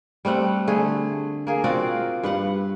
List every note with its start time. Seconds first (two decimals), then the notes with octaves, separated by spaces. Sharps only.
0.25 G3 A3 C4 F#5
0.67 D3 A3 G#4
1.47 A#3 G#4
1.64 C4 F4 F#4 D5
2.23 G2 B4 F#5